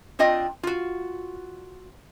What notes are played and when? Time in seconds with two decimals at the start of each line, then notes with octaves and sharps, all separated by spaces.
0.19 C4 D4 F4 D#5 G5
0.63 F4 F#4